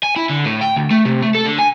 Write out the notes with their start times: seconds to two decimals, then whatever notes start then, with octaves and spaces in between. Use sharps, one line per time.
0.03 G#5
0.16 E4
0.30 D3
0.45 A2
0.61 G5
0.76 D2
0.91 A3
1.05 C3
1.22 A3
1.35 A4
1.46 D3
1.59 G#5